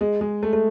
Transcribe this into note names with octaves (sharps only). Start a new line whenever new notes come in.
G#3
G#3
A3
A3